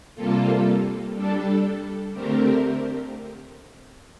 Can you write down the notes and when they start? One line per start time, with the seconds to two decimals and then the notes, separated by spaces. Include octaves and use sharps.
0.15 C3 G3 A#3 F4 A4
1.14 G3 D4 A4
2.13 D3 A3 C4 G4 A#4